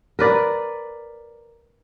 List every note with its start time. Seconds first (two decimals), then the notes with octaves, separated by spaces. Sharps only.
0.19 A#4 B4 D5